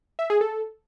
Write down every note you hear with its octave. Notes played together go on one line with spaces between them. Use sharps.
E5
G#4
A4